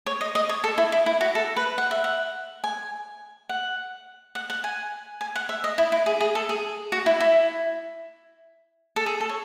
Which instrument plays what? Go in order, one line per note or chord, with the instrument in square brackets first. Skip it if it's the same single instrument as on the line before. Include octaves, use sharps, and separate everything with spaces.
[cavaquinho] C#5
D#5
D#5
C#5
A4
E4
E4
E4
F#4
A4
B4
F#5
E5
F#5
G#5
F#5
F#5
F#5
G#5
G#5
F#5
E5
D#5
E4
E4
G#4
G#4
A4
G#4
F#4
E4
E4
A4
G#4
A4
C#5